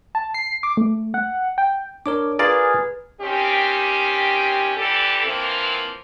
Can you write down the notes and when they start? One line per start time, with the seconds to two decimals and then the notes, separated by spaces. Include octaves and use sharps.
0.15 A5
0.34 C7
0.63 D6
0.77 A3
1.14 F#5
1.58 G5
2.06 D4 A#4 C#5 D6
2.39 F4 G#4 A#4 B4 D5 G#5 F6 A6
3.21 D#3 C4 C#4 G4
4.77 D3 E3 G4 A4
5.25 E3 F3 A#3 C4